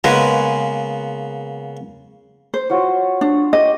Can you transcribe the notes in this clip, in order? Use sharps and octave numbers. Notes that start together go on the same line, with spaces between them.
C#3 G#3 A#3 B3 B4
C5
F4 F#4 C#5
D4
G4 D#5